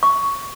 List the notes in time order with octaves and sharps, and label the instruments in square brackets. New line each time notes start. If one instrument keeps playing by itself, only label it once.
[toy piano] C#6